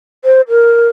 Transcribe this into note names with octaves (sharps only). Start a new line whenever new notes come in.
C5
A#4